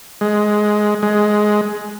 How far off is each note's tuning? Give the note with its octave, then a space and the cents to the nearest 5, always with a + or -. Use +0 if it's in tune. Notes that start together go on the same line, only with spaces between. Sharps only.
G#3 +10
G#3 +10